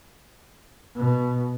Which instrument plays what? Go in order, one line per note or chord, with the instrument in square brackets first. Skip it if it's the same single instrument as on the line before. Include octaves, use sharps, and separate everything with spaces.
[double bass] B2